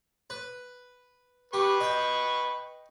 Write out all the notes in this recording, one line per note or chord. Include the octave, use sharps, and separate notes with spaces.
B4
G4 B4 C#6
D#5 G5